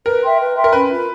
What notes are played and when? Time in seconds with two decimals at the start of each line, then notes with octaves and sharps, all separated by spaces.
0.06 A#4 B4
0.23 E5 G5 C6
0.40 B4
0.56 E5 G5 C6
0.64 A#4
0.73 C#4 B4
0.90 F4 A#4